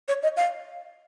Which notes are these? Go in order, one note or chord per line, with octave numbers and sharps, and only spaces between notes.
C#5
D#5
F5